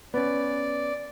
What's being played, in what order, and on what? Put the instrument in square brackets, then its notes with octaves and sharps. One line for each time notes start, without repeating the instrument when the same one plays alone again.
[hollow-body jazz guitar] B3 C#4 [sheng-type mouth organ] D5